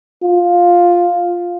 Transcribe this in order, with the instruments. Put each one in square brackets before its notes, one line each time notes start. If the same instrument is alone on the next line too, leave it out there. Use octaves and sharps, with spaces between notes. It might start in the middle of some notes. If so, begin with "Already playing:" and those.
[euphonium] F4